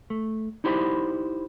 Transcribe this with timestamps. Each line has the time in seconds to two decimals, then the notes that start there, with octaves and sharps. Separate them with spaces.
0.10 A3
0.64 D#4 E4 G4 C5 A5 B5